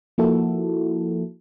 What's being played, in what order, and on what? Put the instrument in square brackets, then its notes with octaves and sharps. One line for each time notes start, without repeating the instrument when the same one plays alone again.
[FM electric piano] F3 A#3 E4 F#4 A4